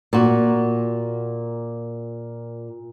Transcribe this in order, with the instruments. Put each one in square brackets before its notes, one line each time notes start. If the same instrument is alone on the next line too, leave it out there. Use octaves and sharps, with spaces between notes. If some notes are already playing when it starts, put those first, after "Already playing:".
[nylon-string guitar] A#2 F#4